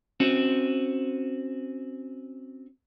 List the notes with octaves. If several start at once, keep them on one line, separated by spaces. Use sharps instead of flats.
C4 C#4 F#4